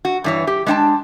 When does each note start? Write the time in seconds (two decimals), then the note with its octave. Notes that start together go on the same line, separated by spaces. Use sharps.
0.05 F#4
0.24 G2 E3 C#5
0.47 G4
0.66 G#3 A3 D4 F#5 G5 A5